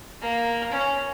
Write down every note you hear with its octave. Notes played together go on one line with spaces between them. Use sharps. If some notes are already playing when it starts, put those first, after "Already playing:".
A#3
C#4